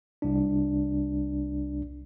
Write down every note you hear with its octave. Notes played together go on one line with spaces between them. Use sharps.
C2 D4